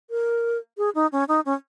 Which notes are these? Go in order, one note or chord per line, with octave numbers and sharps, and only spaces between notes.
A#4
G#4
D#4
C#4
D#4
C#4